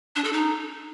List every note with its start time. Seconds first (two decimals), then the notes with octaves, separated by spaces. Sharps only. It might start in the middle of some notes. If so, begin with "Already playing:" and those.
0.16 D4
0.24 A4
0.33 D#4